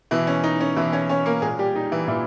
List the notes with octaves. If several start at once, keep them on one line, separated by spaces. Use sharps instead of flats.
B2 E3 E4
C#4
D#4
C#4
B2 E3 E4
C#4 C#5
C#4 C#5
A#3 A#4
A#2 G#3 G#4
G3 G4
D#4
E3 E4
A#2 E3 E4